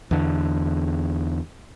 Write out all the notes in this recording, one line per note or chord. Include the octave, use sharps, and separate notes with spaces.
E2 D3